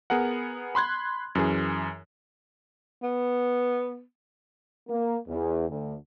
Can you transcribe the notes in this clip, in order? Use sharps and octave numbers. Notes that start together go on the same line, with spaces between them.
B3 G#4 A#4 F#5
B5 C6 F#6 G#6
F#2 E3 G#4
B3
A#3
E2
D2